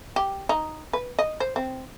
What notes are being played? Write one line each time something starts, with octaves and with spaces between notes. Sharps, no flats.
G4
D#4
B4
D#5
C5
C4